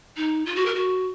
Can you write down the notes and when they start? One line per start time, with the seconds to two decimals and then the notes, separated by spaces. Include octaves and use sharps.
0.16 D#4
0.46 F4
0.56 F#4
0.66 A#4
0.74 F#4